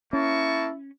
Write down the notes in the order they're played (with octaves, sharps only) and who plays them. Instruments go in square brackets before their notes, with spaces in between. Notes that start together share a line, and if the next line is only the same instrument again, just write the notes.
[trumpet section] A#3 A5 C#6 [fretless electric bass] C#4 [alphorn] E4